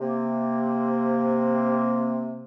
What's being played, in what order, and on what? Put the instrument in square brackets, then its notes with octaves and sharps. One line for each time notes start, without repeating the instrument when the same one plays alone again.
[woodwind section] C3 A#3